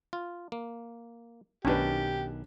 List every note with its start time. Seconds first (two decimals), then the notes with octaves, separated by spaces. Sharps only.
0.13 F4
0.52 A#3
1.65 B1 D#3 C#4 D4 G4 B4